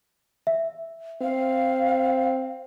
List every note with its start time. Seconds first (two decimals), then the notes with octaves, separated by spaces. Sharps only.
0.47 E5
1.22 C4 F5